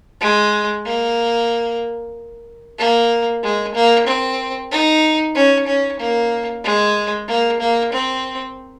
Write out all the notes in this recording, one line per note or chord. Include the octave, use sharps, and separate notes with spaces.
G#3
A#3
A#3
G#3
A#3
C4
D#4
C#4
C#4
A#3
G#3
A#3
A#3
C4